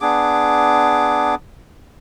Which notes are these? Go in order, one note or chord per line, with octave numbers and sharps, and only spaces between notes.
B3 D4 G#4 D6